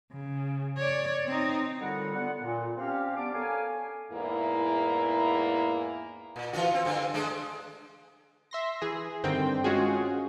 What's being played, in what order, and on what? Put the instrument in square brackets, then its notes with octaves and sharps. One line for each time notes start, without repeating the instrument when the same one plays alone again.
[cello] C#3
C#5 D5
C4 D#4
[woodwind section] D#2 A2 D3 G3 F4 F#5
D3 B3 F#5
A#2
C4 C#4 G4 F5
G3 B3 D4 D6
A4 A#4 C#5 F5 G#5
[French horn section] E2 G#2 A#3 E4
[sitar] A#2
E3 F4 F#4
C4
G2 D3 C4
G#3 A3 D4
[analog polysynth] E5 C6 A#6
E3 G#4
G2 D3 D#3 C4 G5
G#3 C#4 F4 F#4 G#4